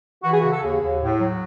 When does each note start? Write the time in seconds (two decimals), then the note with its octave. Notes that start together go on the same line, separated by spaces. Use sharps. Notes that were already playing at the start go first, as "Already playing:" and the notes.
0.22 E3 F#4
0.31 G#4
0.39 C#3 F#4
0.50 A4
0.61 D#2 G#4
0.80 D#2
1.00 A2
1.19 F#3